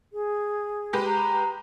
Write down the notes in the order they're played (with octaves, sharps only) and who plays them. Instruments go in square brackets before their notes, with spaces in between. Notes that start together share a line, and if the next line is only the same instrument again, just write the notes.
[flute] G#4
[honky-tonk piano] G#3 G4 B4
[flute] A#5